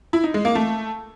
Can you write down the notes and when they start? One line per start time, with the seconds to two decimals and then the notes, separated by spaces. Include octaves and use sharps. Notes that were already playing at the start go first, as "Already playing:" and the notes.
0.13 E4
0.24 D#4
0.34 G#3
0.45 A#3
0.55 A3